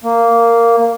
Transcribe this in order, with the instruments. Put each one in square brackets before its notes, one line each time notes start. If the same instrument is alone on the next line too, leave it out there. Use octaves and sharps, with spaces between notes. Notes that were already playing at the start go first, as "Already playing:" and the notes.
[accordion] A#3